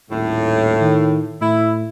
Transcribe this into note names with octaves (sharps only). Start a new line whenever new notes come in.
D#1 A2
D#3
A2 E4